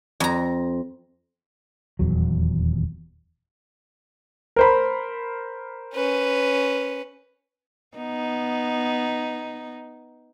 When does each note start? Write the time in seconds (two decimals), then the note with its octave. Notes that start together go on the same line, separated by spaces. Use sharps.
0.20 F2 A#5
1.99 D#1 E2 F#3
4.56 A#4 C5 B5
5.95 C#4 B4
7.97 B3 D#4